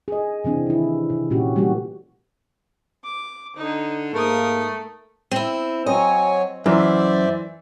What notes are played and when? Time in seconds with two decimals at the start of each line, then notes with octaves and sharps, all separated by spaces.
0.08 G#4 D#5
0.44 C3 E3 C4 D4
0.66 D#3 E4
1.10 C3
1.30 A#2 C#4 F#4 G4
1.56 E3 G3 A3 A#3 F#4 G4
3.04 D6
3.56 D3 D#4
4.14 G#2 A3 A#3 A#4 D#6
5.31 C4 E4 D#7
5.86 F#3 C4 C#5 D#5 G#5
6.66 F#2 E3 C5 D5 E5